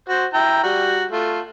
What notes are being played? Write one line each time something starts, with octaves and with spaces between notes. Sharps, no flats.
F#4 C5
E4 G5 A#5
G3 F#4
A3 F4